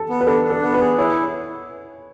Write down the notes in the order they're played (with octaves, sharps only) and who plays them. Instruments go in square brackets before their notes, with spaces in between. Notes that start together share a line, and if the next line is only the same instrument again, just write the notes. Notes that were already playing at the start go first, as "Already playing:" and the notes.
Already playing: [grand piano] A4
[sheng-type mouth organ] B3
[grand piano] B4
[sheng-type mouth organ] D4 [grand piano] A4
[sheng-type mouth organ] D4
[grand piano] A4
[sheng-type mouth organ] B3
[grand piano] B4
[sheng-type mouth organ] G#4
[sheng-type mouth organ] E4 [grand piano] C#5